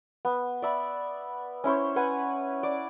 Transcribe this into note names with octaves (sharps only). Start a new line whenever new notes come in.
B3
D5 E5 B5
C#4 E4 C5 C#5
B4 F#5 G#5
D5